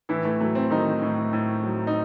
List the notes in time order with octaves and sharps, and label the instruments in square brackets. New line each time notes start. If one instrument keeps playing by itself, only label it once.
[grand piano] A2 E3 E4
A3
F#3 A3
C4
D#3 F#3 D#4
A2
A2
F#3
D#4